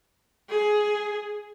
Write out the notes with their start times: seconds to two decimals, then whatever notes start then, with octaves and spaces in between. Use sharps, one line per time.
0.50 G#4